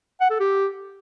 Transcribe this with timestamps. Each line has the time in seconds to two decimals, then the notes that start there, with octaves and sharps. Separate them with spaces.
0.20 F#5
0.30 A4
0.40 G4